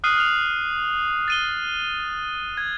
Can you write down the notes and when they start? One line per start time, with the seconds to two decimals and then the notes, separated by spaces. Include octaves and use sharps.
0.04 D#6 F6 F#6 C7 D#7
0.17 F6 F7
1.28 A6 D#7 G7
2.57 G#6